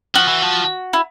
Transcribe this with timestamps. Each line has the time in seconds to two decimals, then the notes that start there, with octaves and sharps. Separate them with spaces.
0.15 F3 F#4
0.28 E3
0.42 F3
0.93 E4